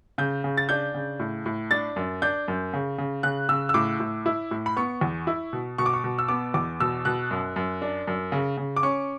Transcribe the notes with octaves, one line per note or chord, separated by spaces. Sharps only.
C#3 G6
C#3
A6
D4 G6
C#3
A2
A2
D4 A6
F#2
D4 G6
F#2
C#3
C#3
C#3 F#6
C#3 E6
E6
A2 D6
A2
E4
A2
B5
B3 C#6
E2
E4
B2
B2 C#6
D6
C#6
B2
E6
B3 D6
E2 D6
B2 E6
B2 F#6
F#2
F#2
D4
F#2
C#3
C#3
D6
C#4 C#6